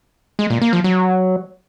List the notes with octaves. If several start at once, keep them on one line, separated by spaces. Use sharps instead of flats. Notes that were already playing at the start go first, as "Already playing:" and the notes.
G#3
A#2
A#3
F3
F#3